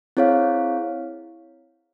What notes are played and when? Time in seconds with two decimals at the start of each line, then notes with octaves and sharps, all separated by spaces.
0.17 C4 E4 G#4 C#5 F5